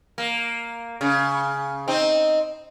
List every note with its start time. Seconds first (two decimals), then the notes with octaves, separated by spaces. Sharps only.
0.18 A#3
1.01 C#3
1.88 C4 D#4